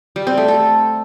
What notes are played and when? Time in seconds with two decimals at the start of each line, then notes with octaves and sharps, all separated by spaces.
0.16 G3
0.27 C4
0.38 A3
0.48 A4